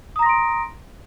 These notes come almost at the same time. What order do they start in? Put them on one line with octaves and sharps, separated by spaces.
D#6 A#5 A#6 C6 D7